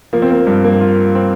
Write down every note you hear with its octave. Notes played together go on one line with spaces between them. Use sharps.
F3 A#3
C4
A#3
G2
A#3
F4
C4